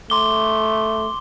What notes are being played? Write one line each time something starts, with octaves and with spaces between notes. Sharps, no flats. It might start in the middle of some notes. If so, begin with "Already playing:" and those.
A3 C6 D6 G7